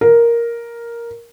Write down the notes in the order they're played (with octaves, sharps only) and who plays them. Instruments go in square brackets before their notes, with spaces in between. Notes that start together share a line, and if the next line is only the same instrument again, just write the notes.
[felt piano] A#4